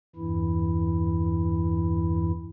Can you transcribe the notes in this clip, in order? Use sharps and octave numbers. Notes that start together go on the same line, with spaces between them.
E2 G2 E3 E4